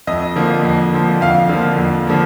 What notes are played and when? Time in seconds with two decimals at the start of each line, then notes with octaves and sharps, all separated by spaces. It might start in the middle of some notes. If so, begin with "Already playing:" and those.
0.07 F2 D#5
0.36 D3 F3 A#3
0.64 F2
0.93 D3 F3 A#3
1.21 F2 F5
1.49 D3 F3 A#3
1.78 F2
2.07 D3 F3 A#3